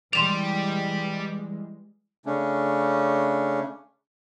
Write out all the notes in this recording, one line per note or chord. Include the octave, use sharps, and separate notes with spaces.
E3 G3 G#3 G4 D5 C6 E7 F7
C#3 A3 C#4 D4